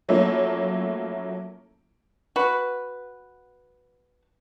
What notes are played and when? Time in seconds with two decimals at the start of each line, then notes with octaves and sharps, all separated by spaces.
0.08 F3 F#3 A3 A#3 C#4 E4
2.36 F#4 B4